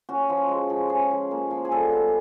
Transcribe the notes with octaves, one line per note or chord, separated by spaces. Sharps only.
C#4 F#4
F3
G#3
F3
C#4 G#4
F3
A#3
F3
G#4
G3 A4
B3